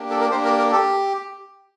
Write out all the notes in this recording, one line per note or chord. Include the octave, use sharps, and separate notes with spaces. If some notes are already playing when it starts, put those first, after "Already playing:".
Already playing: A#3 D4 G4
A4
A#4
A#3 D4 G4 C5
A#4
A#4
G4 A4